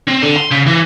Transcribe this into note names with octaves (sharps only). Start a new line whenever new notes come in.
C4
D3
C6
C#3
E3